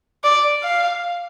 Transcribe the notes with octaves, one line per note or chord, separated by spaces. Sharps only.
D5
F5